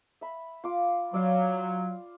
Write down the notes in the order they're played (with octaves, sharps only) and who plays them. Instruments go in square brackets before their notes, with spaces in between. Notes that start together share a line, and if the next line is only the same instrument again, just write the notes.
[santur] E5 B5
F4 D6
[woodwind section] F#3 [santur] D5 F5